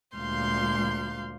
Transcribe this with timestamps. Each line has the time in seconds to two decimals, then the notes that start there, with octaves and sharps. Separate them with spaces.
0.16 D2 A#2 G#3 F5 C6 G6